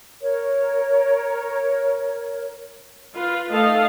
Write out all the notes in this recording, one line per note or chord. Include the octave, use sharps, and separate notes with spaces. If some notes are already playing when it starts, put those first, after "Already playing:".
A#4 C#5
F4 B4
A3 D#4 A4 D#5 F5